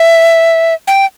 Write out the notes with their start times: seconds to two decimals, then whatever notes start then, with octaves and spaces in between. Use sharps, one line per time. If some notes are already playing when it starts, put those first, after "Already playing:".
Already playing: E5
0.87 G5